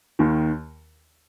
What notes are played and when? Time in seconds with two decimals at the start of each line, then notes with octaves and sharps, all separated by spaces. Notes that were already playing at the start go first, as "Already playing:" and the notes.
0.19 D#2 D#3